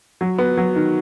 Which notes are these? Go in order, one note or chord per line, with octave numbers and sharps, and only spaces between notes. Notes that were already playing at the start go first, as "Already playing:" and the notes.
F#3
B3
F#3
D#3